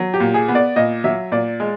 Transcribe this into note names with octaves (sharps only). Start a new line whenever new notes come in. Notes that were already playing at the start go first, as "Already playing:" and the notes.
Already playing: F#3
G4
A#2
G#4
B3
D5
A#2 D#5
F#3 E5
A#2 D5
G#3